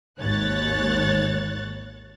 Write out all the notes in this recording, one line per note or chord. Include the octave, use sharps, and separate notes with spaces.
G#1 D#2 C#5 F#6 A6